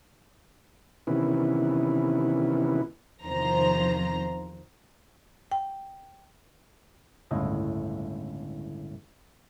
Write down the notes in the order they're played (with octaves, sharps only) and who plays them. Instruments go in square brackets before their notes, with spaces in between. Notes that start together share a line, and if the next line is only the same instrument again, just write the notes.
[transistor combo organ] C3 D#3 E3 B3 C#4 E4
[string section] E2 C3 D#3 F3 C5 A#5
[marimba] G5
[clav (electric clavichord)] G1 C#2 A2 A3 E4 D#5